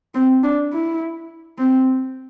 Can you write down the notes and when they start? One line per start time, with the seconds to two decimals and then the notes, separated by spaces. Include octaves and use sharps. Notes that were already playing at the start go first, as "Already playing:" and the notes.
0.15 C4
0.43 D4
0.73 E4
1.58 C4